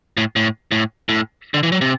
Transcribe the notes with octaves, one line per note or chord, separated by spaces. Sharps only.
A2
A2
A2
A2
D3
E3
F#3
C3